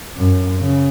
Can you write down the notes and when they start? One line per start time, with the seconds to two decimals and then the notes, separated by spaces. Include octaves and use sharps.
0.17 F#2
0.59 C#3